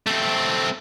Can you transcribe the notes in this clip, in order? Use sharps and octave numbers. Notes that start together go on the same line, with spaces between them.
A3 C4